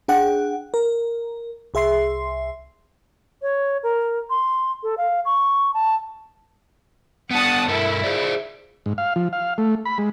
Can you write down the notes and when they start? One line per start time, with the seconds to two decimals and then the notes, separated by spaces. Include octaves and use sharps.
0.08 D4 G#4 F#5 G5
0.74 A#4
1.74 C2 G#4 E5 C6 C7
3.42 C#5
3.83 A#4
4.30 C6
4.83 A4
4.97 F5
5.25 C#6
5.74 A5
7.31 B3 D4 F#5 A5 D#6
7.68 G2 E4 A4 A#4
8.04 G#4 C5 D5
8.86 G#2
8.98 F5
9.16 F3
9.33 F5
9.58 A3
9.85 B5
9.98 G#3